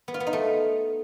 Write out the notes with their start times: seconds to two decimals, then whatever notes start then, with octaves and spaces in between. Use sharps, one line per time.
0.08 B3
0.14 F4
0.20 B3
0.27 D#4
0.33 A3